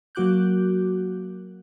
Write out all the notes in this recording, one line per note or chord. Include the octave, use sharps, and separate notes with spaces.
F#3 A#3 F#4 D6 F#6 G6